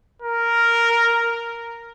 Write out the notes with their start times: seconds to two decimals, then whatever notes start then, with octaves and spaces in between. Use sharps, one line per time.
0.22 A#4